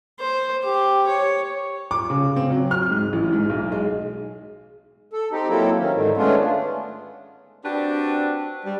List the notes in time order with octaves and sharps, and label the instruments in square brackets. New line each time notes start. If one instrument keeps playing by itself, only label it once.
[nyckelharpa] C5
G4
C#5
[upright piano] D6
C#3
C4
F#3
F6
G#2
A1
G#2
B1
G#3
[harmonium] A4
C4 D#4 G4
F#3 A#3 C4 E4 A4
D#3 C#4
G#2 D3 D#3
G#3 A3 B3 C#4 D4 F4
[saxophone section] C4 D4 F#4 G4 B4 D5
G3